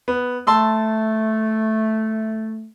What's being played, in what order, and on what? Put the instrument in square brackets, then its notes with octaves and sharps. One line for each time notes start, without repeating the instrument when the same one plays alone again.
[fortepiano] B3
[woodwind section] A3 [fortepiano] A5 C6 E6